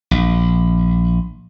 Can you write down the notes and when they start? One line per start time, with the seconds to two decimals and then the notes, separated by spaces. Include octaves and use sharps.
0.11 A#1